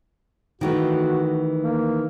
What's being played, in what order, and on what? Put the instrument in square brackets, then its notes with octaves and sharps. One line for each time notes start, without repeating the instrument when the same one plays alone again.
[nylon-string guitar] D#3 E3 A3 [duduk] F#4
[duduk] A#3